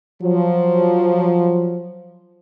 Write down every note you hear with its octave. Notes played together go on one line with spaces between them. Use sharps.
F3 F#3